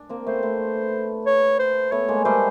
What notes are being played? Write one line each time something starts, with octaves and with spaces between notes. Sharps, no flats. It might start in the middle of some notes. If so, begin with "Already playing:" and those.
Already playing: D4
A#3 C4
A3 B3 C5
A3 B3
C#5
C5
A3 B3 C#5
G#3 A#3
G3 A3 C5